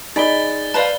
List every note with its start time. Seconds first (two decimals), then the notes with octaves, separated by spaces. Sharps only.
0.16 D#4 G#4 D5 B5 A6 G7
0.74 B4 C5 D5 F5 A5